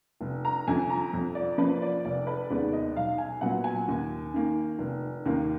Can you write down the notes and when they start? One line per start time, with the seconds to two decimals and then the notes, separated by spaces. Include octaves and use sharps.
0.21 F1
0.45 A#5
0.68 F2 D3 G#5
0.90 A#5
1.13 F2
1.35 D5
1.58 F3 A#3 B4
1.82 D5
2.05 F1 D5
2.27 B4
2.50 D#2 D#3 G#3 B3 D5
2.73 D#5
2.95 B1 F5
3.18 G#5
3.41 A#2 F#3 B3 F#5
3.64 G#5
3.88 D#2
4.34 D#3 A#3
4.79 F1
5.25 D#2 D#3 A#3